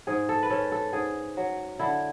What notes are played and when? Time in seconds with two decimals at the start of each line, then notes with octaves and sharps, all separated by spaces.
0.07 G#2 G#4
0.29 A4
0.43 B4
0.50 C#4 A4
0.72 A4
0.93 G#2 G#4
1.37 F#3
1.79 D3 E4